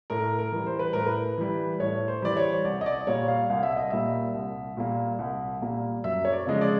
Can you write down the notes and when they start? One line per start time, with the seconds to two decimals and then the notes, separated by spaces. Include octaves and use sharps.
0.10 A2 A#4
0.39 A#4
0.52 E3 G3
0.66 C5
0.79 B4
0.93 A2 A#4
1.06 B4
1.38 E3 G3
1.80 A2 C#5
2.08 C5
2.22 E3 G3 D5
2.37 C#5
2.64 C2 D5
2.81 D#5
2.86 D5
3.07 A#2 G3 A#3 C#5
3.28 F5
3.49 C2 F5
3.63 E5
3.76 D#5
3.90 A#2 G3 A#3 E5
4.34 C2
4.77 A#2 G3 A#3
5.19 C2
5.61 A#2 G3 A#3
6.04 F#2 E5
6.25 C#5
6.32 D5
6.47 C#3 F3 G#3 D#5
6.61 D5